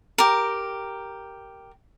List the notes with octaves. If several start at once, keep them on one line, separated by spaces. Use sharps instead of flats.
G4 A#4